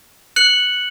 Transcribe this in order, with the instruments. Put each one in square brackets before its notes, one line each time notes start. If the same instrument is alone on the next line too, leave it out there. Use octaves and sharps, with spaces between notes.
[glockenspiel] F#6 C#7 F#7